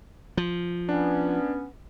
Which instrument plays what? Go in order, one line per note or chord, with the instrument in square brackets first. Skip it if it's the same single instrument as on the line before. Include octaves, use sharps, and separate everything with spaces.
[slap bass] F3
[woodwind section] B3 C#4 [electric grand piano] D4